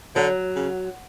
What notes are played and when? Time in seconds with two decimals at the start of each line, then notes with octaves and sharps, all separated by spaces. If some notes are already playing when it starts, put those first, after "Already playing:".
0.16 D3 F#3
0.56 C#3